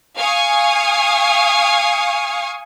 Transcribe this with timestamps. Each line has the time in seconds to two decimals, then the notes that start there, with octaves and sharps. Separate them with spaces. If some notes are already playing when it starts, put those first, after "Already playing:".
0.17 F5 G#5 C#6 D#6